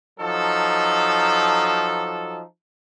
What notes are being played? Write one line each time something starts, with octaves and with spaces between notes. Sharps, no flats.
F3 F#3 D#4 A4